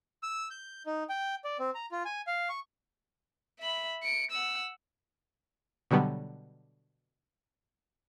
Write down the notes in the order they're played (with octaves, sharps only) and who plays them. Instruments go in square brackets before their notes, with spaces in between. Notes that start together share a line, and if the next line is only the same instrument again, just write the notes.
[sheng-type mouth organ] E6
G6
D#4
G5
D5
C4
A#5
F4
G#5
F5
C#6
[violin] E5 B5
C#7 D7
F#5 E6
[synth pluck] B2 D3 F#3 G3 B3